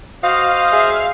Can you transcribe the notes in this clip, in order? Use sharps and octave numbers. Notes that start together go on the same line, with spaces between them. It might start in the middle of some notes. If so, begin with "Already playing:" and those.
F#4 C5 D#5 F5 D#6
G#4 E5